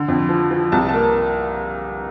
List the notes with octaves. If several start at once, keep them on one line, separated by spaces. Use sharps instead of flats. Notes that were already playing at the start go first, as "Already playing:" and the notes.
Already playing: D3
F2
F3
F3
C2 A5
A#3 A5